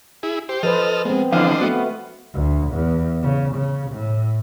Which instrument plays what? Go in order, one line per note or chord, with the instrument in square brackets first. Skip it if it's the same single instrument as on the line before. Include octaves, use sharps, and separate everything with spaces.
[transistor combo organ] E4 G#4
G4 C5
[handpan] F3 B4 C5 [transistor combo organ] A4 D#5 F6
[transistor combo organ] G#3 [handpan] B3 C4
[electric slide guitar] D3 E3 F3 [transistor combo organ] D4 C5 D#5 [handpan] F5
[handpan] A3 F#4 [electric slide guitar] B3
[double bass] D2
E2
C#3
C#3
A2